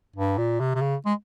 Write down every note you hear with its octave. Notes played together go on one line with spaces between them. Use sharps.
G2
A#2
C3
C3
C#3
G#3